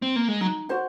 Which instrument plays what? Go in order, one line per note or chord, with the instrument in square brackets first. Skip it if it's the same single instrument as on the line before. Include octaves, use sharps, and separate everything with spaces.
[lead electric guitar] C4
A#3
G#3
[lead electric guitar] F#3 [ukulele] D#4
[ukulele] F#4 C5 F#5